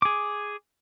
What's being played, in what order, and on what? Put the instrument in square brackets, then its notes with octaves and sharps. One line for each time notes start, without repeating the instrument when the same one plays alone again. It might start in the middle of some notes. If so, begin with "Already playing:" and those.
[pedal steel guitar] G#4 D6